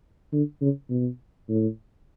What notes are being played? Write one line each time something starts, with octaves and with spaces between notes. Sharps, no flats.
D3
C#3
B2
A2